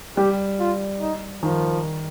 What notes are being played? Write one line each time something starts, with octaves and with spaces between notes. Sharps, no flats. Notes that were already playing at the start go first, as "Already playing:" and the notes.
G3 G4
F4
D#4
D#3 F3